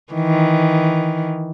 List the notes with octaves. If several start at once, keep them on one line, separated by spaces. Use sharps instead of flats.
D#3 E3